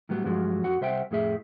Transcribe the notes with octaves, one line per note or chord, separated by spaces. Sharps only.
A2 F#3 G3 B3
G2 F3 F#3 G#3 F#4
F2 F#4 F#5
C2 C5 E5 F#5 G5
F2 A2 G#4 E5